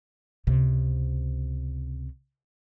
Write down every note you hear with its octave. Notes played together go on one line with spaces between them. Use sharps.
C#2 C3